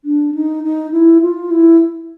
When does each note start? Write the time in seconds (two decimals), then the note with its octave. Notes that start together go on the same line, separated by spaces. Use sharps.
0.05 D4
0.34 D#4
0.64 D#4
0.92 E4
1.22 F4
1.51 E4